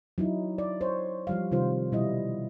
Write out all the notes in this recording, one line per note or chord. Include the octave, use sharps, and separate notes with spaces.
F#3 D#4 E4
D5
C5 C#5
F3 G3 F5
C3 D#3 G3 F4 C5
B2 G3 E4 D#5